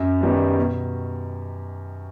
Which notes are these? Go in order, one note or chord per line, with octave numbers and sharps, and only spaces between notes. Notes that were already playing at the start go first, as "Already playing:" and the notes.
Already playing: F#2
D#3 G3 B3
B2